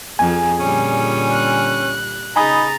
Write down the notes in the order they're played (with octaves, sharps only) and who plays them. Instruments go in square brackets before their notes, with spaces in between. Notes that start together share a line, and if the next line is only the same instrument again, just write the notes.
[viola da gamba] F2 [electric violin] G#4 [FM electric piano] G#5
[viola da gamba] A#2 D3 G3 [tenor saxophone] C#4
[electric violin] F#6
[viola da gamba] C#3 G#4 [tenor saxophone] D#4 [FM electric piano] G#5 B5 D#6 [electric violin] A#5 A6